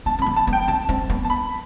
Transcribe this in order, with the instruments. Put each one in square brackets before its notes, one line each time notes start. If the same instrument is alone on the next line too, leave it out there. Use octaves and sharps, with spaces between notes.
[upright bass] B3 [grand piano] A5
[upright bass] C4
[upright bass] B3 [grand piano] B5
[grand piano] A5
[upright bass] B3
[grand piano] G5
[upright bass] C4 [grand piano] A5
[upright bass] C4
B3
[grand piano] A5
B5